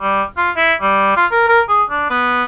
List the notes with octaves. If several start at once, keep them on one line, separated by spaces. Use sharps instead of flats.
G3
F4
E4
G3
F4
A#4
A#4
G#4
D4
B3